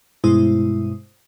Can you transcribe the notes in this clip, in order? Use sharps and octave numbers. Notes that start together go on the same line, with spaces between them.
G2 B2 G#3 E4 C5 D#6